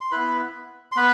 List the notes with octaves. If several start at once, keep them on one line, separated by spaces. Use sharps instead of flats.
C6
B3 E4 B4 B5
C6
B3 B4 B5